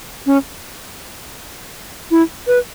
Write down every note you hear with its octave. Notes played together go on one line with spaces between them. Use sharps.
C#4
E4
B4